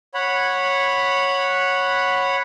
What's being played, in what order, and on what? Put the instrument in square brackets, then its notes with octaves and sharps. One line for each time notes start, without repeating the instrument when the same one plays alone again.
[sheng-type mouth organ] C#5 F#5 B5